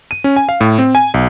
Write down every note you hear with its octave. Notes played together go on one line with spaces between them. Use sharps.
D#7
C#4
G#5
F5
A2
C4
G#5
B1